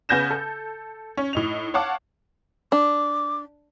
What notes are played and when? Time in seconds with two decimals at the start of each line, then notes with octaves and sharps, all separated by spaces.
0.09 C#3 B3 G#5 G6 A#6 E7
0.30 A4
1.17 C#4
1.33 A2 D#4 F7
1.74 C#5 F5 F#5 A5 D6
2.72 D4 D6